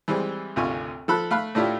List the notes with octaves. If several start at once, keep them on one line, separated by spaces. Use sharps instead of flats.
E3 G3 G#3 C4
G#1 D2 C3 F4 G#5 C#6
F3 A4 B5 F#6
A3 F5 B5 F#6
A2 A3 D4 E4 F4 G4